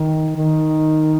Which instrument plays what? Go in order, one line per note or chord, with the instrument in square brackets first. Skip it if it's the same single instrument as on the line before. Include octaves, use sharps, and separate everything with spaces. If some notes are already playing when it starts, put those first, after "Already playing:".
Already playing: [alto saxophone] D#3
D#3